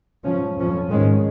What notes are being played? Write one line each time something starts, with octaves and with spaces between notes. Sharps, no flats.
G#2 F3 C#4
F2 F3 C#4
G#2 D#3 G#3 C#4